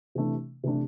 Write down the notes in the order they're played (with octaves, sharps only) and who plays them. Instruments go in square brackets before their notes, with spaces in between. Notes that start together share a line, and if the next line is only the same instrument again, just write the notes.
[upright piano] C3 E3 A3 D4
C3 E3 A3 D4